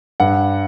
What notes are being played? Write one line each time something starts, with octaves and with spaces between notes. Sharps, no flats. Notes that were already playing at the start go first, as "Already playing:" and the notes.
G2 F#5